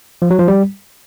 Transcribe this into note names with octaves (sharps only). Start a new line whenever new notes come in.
F3
F#3
F3
G3